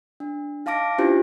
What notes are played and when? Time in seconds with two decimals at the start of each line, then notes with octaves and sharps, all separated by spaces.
0.20 D4
0.66 D#4 F5 A5 D6 A#6 D7
0.98 C#4 D4 E4 F4 G4 C5